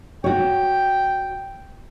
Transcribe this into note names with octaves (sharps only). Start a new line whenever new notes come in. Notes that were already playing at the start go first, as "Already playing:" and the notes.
F#4 C#5 G5